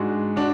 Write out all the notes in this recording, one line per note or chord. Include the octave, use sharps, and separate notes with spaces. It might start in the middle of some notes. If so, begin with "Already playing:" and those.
Already playing: G#2 G#3 D4 F#4
D4 F#4